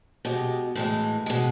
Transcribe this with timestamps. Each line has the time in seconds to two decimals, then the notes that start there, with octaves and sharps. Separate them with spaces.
0.25 B2 G#3 G4
0.75 A2 E3 G#3
1.26 G#3 G4
1.30 B2